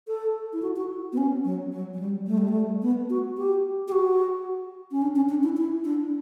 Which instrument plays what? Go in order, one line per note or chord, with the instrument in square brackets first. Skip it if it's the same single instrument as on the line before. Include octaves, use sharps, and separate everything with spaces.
[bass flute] A4
E4
F#4
F#4
B3
C#4
F#3
F#3
F#3
G3
A3
G3
A3
B3
F#4
G4
G4
F#4
C#4
D4
C#4
D4
E4
E4
D4